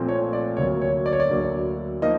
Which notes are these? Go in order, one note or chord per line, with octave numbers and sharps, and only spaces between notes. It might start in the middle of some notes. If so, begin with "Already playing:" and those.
Already playing: A#2 F3 A3 C4
C#5
D5
D2 D3 F#3 A#3 C#5
C#5
D5
C#5
D5
D2 D3 F#3 A#3
F3 A#3 D#4 D#5